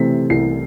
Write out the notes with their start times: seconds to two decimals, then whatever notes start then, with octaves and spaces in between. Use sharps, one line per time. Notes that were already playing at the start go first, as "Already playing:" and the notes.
Already playing: C3 E3 A3 C4 B6
0.30 C2 C7